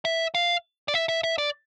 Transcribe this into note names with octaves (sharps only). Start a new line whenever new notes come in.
E5
F5
D5
E5
E5
E5
D5